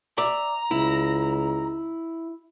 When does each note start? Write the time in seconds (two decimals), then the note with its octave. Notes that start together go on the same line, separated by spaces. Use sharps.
0.18 D5 E5 A#5
0.71 C#2 E4